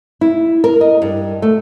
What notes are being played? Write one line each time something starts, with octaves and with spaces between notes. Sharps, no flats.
E4
A#4
D#5
G2
A3